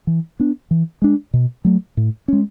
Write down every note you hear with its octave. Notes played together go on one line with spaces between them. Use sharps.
E3
B3 D4
E3
G#3 D4
B2
F#3 A3
A2
G#3 C#4